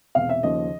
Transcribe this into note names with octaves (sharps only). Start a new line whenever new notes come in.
E1 E2 C3 F5
E5
D#2 C#3 F3 D#5